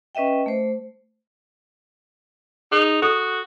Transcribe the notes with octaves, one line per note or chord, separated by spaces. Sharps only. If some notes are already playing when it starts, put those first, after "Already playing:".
C#4 B4 D#5 E5 G5
A3 C5
D#4 G#4
F#4 A4 D#6